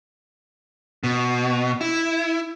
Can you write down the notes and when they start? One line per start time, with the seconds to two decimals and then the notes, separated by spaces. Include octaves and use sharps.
1.04 B2
1.81 E4